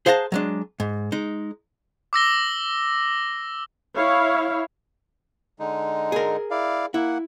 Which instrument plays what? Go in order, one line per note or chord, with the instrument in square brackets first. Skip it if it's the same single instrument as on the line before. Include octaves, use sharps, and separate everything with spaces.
[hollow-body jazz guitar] G#4 C5 F5 F#5 A5 A#5
F#3 G#3 D4
G#2
G#3 D#4
[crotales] D6 E6 A#6 G7
[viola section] E4 C#5 F5
[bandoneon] D3 G#3 D#4
[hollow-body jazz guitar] G#4 A#4
[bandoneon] E4 D5 F5
[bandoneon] A#3 F#5 [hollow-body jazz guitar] E4